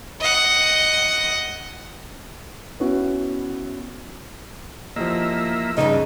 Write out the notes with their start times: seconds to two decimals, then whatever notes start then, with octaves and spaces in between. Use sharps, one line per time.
0.20 D#5 F#5
2.80 B3 C#4 E4 F#4
4.96 E2 F3 A#3 G4 D#5 E5
5.77 G2 C#3 D#4